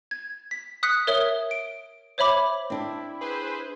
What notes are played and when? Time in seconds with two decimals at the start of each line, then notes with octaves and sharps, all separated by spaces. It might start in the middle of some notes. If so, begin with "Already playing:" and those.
0.11 G#6
0.51 B6
0.83 D#6 F#6 B6 C#7
1.07 A#4 C#5 E5 D#6 G7
1.51 D7
2.18 C5 C#5 E5 B5 D6
2.70 C4 D4 E4
3.21 G#4 B4 C5